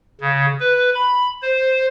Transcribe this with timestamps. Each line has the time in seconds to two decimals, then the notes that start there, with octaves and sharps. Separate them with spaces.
0.21 C#3
0.60 B4
0.95 B5
1.42 C5